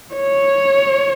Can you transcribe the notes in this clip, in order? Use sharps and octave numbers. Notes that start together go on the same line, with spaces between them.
C#5